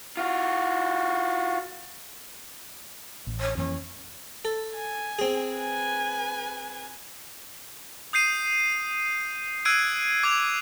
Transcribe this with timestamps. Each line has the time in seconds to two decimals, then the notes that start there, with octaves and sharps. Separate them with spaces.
0.17 F4 F#4
3.27 A1
3.40 C#5
3.57 F2 E3 A#3 C#4
4.45 A4
4.75 G#5
5.19 C4 G#4
5.55 B4 G#5
8.13 D#6 G6 C7 D#7
9.65 E6 F#6 G#6 C7 D7 D#7
10.23 D6 G#6 F7